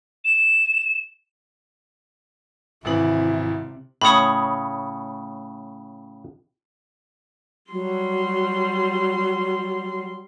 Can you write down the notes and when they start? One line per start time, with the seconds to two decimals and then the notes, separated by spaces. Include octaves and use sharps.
0.24 E7
2.85 G#1 C3 E3 E4 F#7
4.01 A2 C#3 C#5 B5 D#6
7.72 F#3 G3 C6